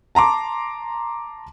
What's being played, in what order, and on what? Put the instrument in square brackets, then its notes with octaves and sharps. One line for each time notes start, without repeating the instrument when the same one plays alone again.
[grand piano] A5 A#5 C6 D6